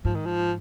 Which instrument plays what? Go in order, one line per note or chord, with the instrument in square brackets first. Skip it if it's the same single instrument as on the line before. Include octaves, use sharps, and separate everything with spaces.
[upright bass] G#2 [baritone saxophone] F3
[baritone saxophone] D#3
F3